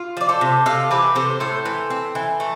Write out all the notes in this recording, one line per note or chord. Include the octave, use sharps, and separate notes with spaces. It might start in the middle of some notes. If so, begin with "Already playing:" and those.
Already playing: F4
F3 D5
A4 C5
C3
C3 F4 A4
E3 G4 B4
C3 A4 C5
A2 A4 C5
E3
C4
E3
A3